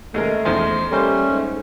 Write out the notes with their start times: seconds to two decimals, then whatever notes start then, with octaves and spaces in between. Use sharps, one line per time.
0.14 D#2 G#3 A3 A#4
0.45 E2 D#3 F3 C5
0.92 G3 A3 A#3 C#4 C5
1.29 G#2